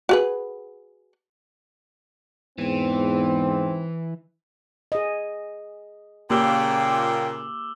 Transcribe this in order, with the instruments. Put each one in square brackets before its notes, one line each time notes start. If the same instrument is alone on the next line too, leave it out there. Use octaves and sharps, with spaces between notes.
[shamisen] F#4 G#4 B4
[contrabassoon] E2 [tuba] G#2 [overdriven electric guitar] E3 [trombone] C4
[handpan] G#4 D#5
[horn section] A#2 C#3 [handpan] A#3 G4 [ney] G5 [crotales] D6 E6 G7